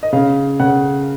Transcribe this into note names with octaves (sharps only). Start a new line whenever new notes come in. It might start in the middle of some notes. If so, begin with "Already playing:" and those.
D#5
C#3 F5
C#3 F#5